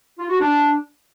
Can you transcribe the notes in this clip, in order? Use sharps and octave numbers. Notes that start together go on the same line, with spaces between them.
F4
F#4
D4